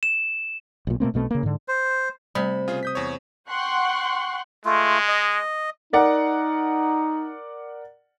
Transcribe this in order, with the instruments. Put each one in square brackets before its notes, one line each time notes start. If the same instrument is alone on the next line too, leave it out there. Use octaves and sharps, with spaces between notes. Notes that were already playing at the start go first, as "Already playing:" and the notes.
[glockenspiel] E7
[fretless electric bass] B1 A#2
B2 A3 A#3 C4
B1 B2 A3 C4
C#3 A#3
G#2 D3
[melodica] C5
[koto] C3 [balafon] G3 A3 [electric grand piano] B5
[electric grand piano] C#3 F4 G#4
D#6 G6 B6
E2 C#5
[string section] F#5 G5 C6 C#6 F#6
[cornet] G#3 [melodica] A3 F4
[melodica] D#5
[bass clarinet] D#4 [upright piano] A#4 D5 F#5